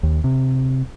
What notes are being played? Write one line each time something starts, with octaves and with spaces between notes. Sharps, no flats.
D#2
C3